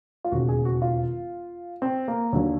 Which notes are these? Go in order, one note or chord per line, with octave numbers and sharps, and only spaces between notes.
F4
E1 D#2 C#3 F#4
G#4
F#4
F4
C4
A#3
D#2 D3 F#3